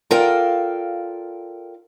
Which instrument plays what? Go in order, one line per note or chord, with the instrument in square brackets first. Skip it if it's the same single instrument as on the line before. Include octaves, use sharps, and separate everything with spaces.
[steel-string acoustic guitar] F4 A4 A#4 D5 F5 G5